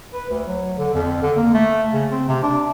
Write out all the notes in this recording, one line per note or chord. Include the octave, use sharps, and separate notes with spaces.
B4
D2
F#3
D3
F2
D3
A#3
A3
C#3
C4
C3
D4